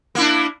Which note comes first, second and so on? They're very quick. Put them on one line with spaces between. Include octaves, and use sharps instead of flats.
A#3 E4 D4